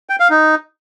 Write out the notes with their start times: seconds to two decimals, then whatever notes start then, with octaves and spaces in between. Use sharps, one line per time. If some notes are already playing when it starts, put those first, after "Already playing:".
0.10 G5
0.20 F5
0.30 D#4